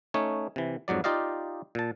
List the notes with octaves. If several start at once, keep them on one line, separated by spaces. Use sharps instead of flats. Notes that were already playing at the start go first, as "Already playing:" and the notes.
A3 C#4 D#4 C#5
C3 E3
F2 G#2 F#3 D5
D#4 F4 G4 D5 D#5 F5
A#2 A5